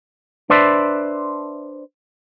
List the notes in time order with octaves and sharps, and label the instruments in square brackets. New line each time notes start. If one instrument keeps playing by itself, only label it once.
[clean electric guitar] D4 B4 C5 D5 E5